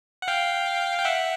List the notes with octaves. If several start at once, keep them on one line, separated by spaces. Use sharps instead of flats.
F#5
F5 G5
G5
E5 F#5